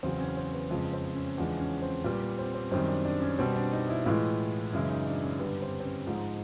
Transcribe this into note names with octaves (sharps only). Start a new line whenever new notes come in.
E2 C#3 F#3 C4
C#4
C4
B3
F2 C#3 F3 G#3 B3
C4
C#4
E2 C#3 F3 G#3 D4
C#4
C4
A#2 G3 B3
B3
C4
C4
F#2 D#3 G3 C4
D4
D4
C#4
B2 G3 C4
D4
D#4
E4
A2 E3 G#3 F4
F#2 C#3 E3 G#3 E4
D#4
D4
C#4
G2 D3 G3 B3
C4
C4
C#4
G#2 F3 G#3 D#4